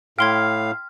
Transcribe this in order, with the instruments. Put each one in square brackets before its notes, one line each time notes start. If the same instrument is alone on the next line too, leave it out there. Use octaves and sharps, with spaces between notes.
[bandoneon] A2 F5 [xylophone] G5 C6 G#6 [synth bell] F6